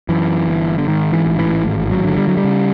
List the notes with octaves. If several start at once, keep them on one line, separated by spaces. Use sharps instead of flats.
F#2 E3
G1
D3
G#2 D#3
E3
A1
E3
G#1
F#3
D3
G3
F#3
G3
C#3